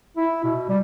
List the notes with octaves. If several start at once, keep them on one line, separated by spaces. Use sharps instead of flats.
E4
B2
G3